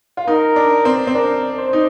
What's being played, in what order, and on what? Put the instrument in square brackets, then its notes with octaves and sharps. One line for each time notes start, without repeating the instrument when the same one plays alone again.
[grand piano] F4
[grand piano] D#4 [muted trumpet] A#4
[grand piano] D4
C4
C4
[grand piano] D4 [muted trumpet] A#4
[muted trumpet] C5
[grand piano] D#4